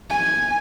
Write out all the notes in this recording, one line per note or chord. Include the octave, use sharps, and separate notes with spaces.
G#5